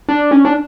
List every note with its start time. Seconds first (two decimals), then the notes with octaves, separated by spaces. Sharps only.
0.09 D4
0.31 C#4
0.45 D4